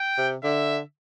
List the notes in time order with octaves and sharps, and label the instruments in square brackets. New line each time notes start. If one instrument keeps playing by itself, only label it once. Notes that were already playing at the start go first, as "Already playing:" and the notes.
Already playing: [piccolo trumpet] G5
[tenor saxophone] C3
[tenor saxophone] D3 [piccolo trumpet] E5